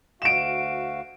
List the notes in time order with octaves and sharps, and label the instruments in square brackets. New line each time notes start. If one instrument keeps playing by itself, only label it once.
[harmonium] D2 F#4 F5 [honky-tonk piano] D7 E7